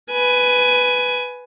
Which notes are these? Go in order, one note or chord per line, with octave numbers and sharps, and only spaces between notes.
B4 G#5